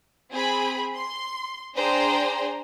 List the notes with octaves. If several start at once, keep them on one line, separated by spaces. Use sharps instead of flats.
C4 G#4 B5
C6
D4 G#4 C5 G5 A#5 C6